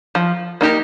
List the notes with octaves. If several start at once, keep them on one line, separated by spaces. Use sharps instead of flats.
F3
A#3 D#4 G4 A#4